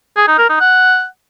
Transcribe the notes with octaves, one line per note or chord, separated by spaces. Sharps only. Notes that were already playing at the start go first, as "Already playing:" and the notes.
G#4
D#4
A#4
D#4
F#5